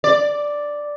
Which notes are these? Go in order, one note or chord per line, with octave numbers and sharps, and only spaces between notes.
D5